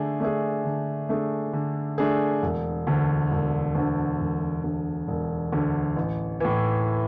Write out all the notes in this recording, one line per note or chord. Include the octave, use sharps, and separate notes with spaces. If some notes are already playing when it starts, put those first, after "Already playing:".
Already playing: D3 A3 D4 G#4
A3 D4 G#4
D3
A3 D4 G#4
D3
A3 D4 G#4
E1
D2 D3
E1
D2 D3
E1
D2 D3
E1
D2 D3
A1
A2 E3